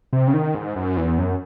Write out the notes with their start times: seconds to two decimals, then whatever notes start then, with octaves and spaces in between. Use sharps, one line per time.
0.13 C3
0.27 C#3
0.34 D#3
0.55 G#2
0.76 F#2
0.97 E2
1.18 F#2